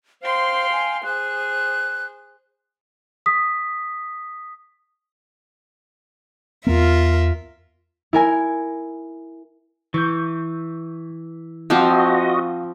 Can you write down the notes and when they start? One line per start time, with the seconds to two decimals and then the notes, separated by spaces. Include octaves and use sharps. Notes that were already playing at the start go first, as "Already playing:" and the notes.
0.23 C5 F5 G5 C6
0.72 G#5
1.04 G#4 C5 F#6
3.26 D#6 B6
6.67 E2 B3 F4 A#4 E5
8.13 E4 A#4 G#5
9.94 E3 C#6 G6
11.70 F3 C4 F4 F#4 D#5 F5 F#5 D6